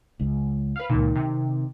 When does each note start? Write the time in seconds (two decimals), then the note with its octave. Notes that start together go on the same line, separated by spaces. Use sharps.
0.20 C#2
0.76 B4 F5
0.89 C#2 A#2 D#3
1.15 C3